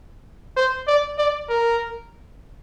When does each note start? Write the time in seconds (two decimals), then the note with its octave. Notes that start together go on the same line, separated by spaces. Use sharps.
0.57 C5
0.87 D5
1.18 D5
1.49 A#4